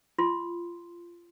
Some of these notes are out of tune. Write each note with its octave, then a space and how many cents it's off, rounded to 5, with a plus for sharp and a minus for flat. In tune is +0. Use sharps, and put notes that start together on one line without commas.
F4 -20 C6 +0